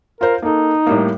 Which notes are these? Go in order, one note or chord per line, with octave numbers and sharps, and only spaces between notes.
F4 A#4 C5
A#3 D#4 A4
A2 G3 A#3